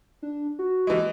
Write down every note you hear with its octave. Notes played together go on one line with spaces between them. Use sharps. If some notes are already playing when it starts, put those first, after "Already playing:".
D4
F#4
E3 G#3